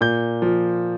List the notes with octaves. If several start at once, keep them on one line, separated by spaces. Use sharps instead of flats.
A#2 G6
F3